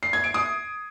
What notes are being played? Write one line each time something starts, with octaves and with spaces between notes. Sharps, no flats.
C7
G#6
D7
D#6